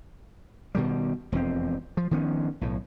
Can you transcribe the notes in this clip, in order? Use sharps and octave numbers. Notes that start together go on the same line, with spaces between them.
B2 D#3 G3
E1 F2 F#3 C4
F3
D#3 F3 B3 C#4
B1 A2